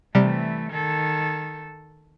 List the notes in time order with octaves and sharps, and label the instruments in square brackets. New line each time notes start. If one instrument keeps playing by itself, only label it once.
[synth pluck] C3 G3 [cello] E3 A3
[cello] D#3 A4